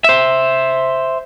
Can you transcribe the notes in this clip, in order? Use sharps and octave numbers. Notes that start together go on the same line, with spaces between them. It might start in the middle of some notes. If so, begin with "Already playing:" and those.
C5 E5